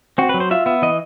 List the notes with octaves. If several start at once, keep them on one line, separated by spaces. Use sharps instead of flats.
C4 F#4
B4
F#3
C5
F4 E5
B3 E5
E3 D#5